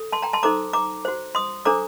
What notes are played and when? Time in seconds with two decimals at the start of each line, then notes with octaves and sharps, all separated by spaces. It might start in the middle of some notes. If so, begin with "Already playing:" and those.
Already playing: A4
0.12 A5 C6
0.23 G5 A#5
0.33 A5 C6
0.43 D#4 A4 C5 A#5 D6
0.73 A#5 D6
1.05 F#4 C5
1.35 C6 D#6
1.65 D4 A4 C5 A#5 D6